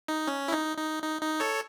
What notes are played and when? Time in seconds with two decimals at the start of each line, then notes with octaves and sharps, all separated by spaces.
0.08 D#4
0.27 C#4
0.48 E4
0.52 D#4
0.77 D#4
1.03 D#4
1.22 D#4
1.40 A4 C#5